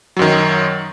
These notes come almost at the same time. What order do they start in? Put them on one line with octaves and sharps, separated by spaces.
F#3 F#2 D#3